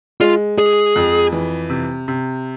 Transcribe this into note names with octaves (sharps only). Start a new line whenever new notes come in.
G#3 F4
G#3 G#4
F2
E3
C3
C3